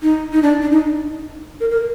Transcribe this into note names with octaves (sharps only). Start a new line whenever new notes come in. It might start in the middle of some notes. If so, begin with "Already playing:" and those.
D#4
D#4
D4
D4
D#4
A#4
A#4